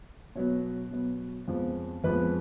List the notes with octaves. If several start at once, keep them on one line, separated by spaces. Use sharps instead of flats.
B2 F#3 B3 C#5
B2 F#3 B3
F2 F3 G#3 B3
F2 F3 G#3 B3 B4